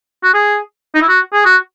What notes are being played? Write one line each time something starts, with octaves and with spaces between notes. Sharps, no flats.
F#4
G#4
D#4
E4
F#4
G#4
F#4